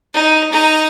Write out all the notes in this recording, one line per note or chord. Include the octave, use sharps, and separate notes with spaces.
D#4
D#4 A#5